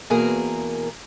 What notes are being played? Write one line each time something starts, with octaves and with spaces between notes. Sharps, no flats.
E2 B2 A#3 G#4 A#4